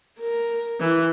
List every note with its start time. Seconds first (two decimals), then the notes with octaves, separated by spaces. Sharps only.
0.20 A#4
0.79 E3